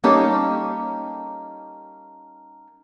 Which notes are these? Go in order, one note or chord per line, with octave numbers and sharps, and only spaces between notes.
G3 A#3 C#4 D#4 G4 A4